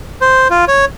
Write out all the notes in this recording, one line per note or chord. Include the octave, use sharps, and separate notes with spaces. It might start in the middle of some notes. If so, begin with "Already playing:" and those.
C5
F4
C#5